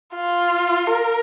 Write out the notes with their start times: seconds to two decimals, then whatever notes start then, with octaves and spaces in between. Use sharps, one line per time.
0.15 F4
0.87 A#4